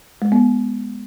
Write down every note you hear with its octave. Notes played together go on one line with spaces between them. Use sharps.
G#3
B3